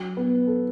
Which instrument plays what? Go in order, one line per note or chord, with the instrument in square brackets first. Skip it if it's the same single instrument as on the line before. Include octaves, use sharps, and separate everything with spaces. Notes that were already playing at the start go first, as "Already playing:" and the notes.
Already playing: [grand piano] F#3
B3
A4